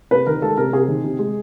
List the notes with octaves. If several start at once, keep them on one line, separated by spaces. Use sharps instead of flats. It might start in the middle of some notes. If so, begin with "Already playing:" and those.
C3 B4
D#3 A#4
G#3 A4
C3 A#4
C3 G#4
D#3
C3
G#3